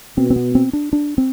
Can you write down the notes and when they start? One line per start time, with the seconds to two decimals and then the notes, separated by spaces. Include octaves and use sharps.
0.17 B2 C4
0.30 C4
0.36 B3
0.55 C4
0.73 D4
0.93 D4
1.18 C4